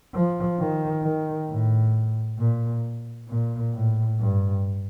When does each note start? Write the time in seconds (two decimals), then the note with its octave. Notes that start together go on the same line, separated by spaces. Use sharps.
0.14 F3
0.59 D#3
1.03 D#3
1.49 A2
2.39 A#2
3.29 A#2
3.73 A2
4.19 G2